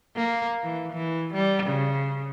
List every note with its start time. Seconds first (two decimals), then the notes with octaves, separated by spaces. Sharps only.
0.16 A#3
0.63 E3
0.92 E3
1.34 G3
1.66 C#3